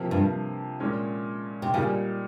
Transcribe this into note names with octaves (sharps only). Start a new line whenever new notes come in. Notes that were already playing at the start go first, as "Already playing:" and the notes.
Already playing: C3 F3 A#3
G2
A#2 G#3 C#4
C3
A#2 C#3 G3 A#3 D#4